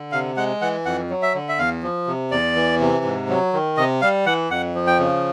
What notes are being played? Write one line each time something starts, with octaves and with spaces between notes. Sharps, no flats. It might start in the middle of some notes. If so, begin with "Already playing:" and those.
Already playing: D3
C3 F5
G#3 F#5
E3 F#5
F2 F#5
F#3
E5
D3
E5
E2 F5
F3
C3
E2 D5
E3
C3
G#2
F#3
D#3
C3 D#5
G3 F5
E3 F#5
F2 F#5
F3
G5
C#3